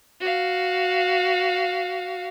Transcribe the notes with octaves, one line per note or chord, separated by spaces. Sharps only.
F#4 F5